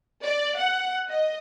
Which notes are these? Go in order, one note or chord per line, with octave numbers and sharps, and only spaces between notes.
D5
F#5
D#5